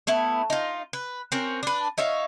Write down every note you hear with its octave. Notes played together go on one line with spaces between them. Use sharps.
A3 B3 E4
D#4 F4
B4
C4 C#4 F#4 A#4
D4 B4
D#4 C#5 E5 F5